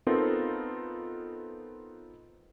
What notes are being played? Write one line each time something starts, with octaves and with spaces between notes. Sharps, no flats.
B3 C4 D#4 F4 A4 A#4